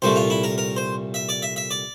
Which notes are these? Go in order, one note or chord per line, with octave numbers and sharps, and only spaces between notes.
C2 A#2 A3 C5
F4
E4
A#4
A#4
C5
E5
D5
E5
E5
D5